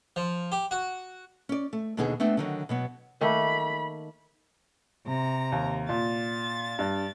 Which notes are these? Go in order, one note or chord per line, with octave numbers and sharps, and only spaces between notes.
F3
G4
F#4
C#4 D5
A3
D#2 B2 D3 B3 D#4 G#4
A3 B3 C4 D4
D3 D#3 F#3
B2 F#3 B3
D#3 A3 A#3 B5
C3 A#5
D#2
A#2 A6
G2